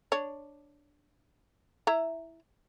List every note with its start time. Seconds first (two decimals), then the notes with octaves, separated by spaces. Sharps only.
0.12 D4 C#5
1.87 E4 E5 A#5